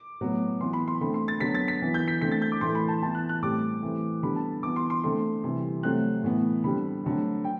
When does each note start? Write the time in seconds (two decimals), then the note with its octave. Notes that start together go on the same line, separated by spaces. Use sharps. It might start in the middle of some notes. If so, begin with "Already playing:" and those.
Already playing: D6
0.21 A2 F#3 B3
0.60 E3 B3 C6
0.73 B5
0.88 C6
1.01 D3 A3 C4 B5
1.14 C6
1.28 A6
1.40 D3 F#3 B3 B6
1.55 A6
1.68 B6
1.82 E3 B3
1.94 G6
2.08 B6
2.21 D3 A3 C4 B6
2.32 A6
2.42 G6
2.52 D6
2.61 A2 E3 A3 C6
2.75 B5
2.88 A5
3.02 E3 B3 A5
3.15 F#6
3.29 F#6
3.42 A2 G3 C4 D6
3.82 E3 A3 C4
4.22 D3 G3 B3 B5
4.36 A5
4.63 E3 B3 D6
4.76 C6
4.90 C6
5.04 D3 A3 C4 C6
5.44 C3 E3 G3
5.83 C3 F#3 A3 C4 F#6
6.23 A2 E3 B3
6.64 D3 G3 C4 B5
7.04 D3 F#3 A3 C4
7.44 G5